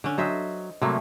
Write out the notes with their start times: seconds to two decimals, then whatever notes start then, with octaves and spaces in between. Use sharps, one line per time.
0.04 D3 C#4
0.18 F#3 C5 D#5 E5
0.82 C3 F#3 G3 A3 A#3